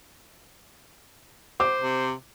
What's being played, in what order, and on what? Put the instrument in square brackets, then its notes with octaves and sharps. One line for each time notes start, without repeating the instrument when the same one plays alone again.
[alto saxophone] C5 [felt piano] D6
[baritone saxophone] C3